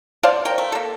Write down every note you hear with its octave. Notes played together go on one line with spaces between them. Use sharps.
C5 D5 F5 A5
A#4 G5
A3
A#3 A4